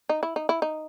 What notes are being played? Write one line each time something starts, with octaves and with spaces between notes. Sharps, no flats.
D#4
E4
D#4
E4
D#4